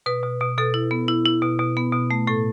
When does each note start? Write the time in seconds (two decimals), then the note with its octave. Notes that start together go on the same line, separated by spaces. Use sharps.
0.06 B2 B4
0.23 B2
0.41 B2
0.58 B2 A4
0.74 E4
0.91 B3
1.08 E4
1.25 E4
1.42 B2
1.59 B2
1.77 B3
1.93 B2
2.11 A3
2.27 A2 A4